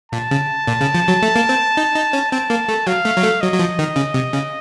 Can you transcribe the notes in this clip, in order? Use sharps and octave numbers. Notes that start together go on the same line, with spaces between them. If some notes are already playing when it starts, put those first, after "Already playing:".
A#2 A5
C#3
A#2
C#3
F3
F#3
A3
A#3
C4
D#4
D#4
C#4
C4 A5
A#3
A3
F#3 F5
A3
F#3
A3
F#3 D#5
F#3
F3
D#3
C#3
C3
C#3